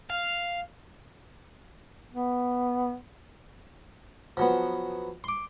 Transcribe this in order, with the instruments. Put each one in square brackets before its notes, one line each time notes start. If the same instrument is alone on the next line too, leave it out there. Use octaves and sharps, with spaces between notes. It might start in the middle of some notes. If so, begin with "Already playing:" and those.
[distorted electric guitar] F5
[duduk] B3
[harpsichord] F3 F#3 B3
C6 D6